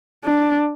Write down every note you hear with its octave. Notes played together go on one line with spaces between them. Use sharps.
D4